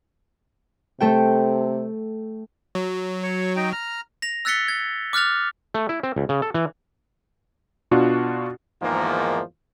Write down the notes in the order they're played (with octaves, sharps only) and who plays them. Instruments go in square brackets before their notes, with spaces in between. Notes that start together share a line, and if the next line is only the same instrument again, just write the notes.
[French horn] C3 [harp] A3 A4 G5
[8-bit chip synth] F#3
[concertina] C#5
D#4 G5
A#5 F6
[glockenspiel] A#6 F7
E6 F#6 A6 B6 C#7 G7
G#6
D6 F6 F#6 A6 F7
[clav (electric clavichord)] A3
E4
C4
C#2
C#3
A4
E3
[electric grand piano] B2 D4 F4 F#4
[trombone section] E2 G#2 D#3 F3 A#3